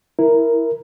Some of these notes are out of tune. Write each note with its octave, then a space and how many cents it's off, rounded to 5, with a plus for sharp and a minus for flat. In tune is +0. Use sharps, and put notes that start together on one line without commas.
E4 +0 A#4 +0